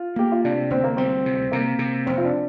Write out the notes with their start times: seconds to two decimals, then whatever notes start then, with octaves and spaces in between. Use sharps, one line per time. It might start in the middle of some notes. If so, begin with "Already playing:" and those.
Already playing: F4
0.16 A#3 G4
0.32 F4
0.45 C3 D4
0.70 D2 C4
0.84 A#3
0.97 G3 C4
1.26 C3
1.52 C3 A#3
1.79 C3
2.06 F1 C4
2.18 F4
2.24 D4